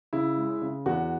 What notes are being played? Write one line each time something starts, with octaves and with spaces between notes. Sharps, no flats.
C#3 E4
G#3
C#3
E2 F#4